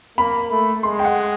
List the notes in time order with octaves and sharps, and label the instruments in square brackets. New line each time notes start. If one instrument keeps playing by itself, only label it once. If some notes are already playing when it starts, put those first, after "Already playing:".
[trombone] A#3 [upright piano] B5
[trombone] A3
[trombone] G#3 [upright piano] C6
[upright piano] G5
F#5